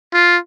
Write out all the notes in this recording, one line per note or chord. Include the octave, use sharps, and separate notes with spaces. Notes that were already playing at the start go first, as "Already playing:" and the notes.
F4